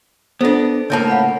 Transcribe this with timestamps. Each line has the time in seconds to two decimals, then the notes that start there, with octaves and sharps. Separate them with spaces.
0.41 B3 D4 F4 A4 C5
0.90 C#2 A2 A#3 C#5 E5 A5
1.08 F5 F#5 B5